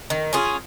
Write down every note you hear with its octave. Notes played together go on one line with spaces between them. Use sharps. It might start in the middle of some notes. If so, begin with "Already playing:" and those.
D#3
C#4 F4 G#4